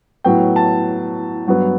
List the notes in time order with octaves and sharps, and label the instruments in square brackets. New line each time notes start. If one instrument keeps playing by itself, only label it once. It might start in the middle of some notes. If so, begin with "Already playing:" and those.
[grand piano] A2 F#3 B3 G5
A5
G2 F#3 B3